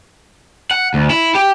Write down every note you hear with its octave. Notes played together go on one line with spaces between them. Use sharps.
F#5
D2
E4
G4